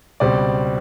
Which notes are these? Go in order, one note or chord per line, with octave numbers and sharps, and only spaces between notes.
C#2 B2 G3 C4 D5